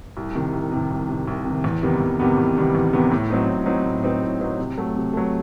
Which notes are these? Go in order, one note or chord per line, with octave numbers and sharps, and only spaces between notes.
C2
C3 D#3
C2
C3 D#3
C2
C3 D#3
C2
C3
D#3
E2
C3 D#3 G3 B3
E2
C3 D#3 G3 B3
E2
C3 D#3 G3 B3
E2
C3 D#3 G3 B3
A2
F#3 C4 D#4
A2
F#3 C4 D#4
A2
F#3 C4 D#4
A2
F#3 C4 D#4
C3
F#3 A3
C3
F#3 A3